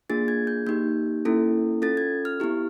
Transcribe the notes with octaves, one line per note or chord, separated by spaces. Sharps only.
A#3 D4 F4 G#4 A6
G#6
G6
A#3 D#4 G4 G6
A#3 C#4 E4 A4
C#4 F4 A4 A6
G#6
F6
B3 E4 G4